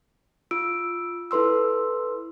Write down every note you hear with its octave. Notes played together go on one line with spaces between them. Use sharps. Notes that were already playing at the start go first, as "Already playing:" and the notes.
F4 E6 D7
E4 A4 B4 C6 E6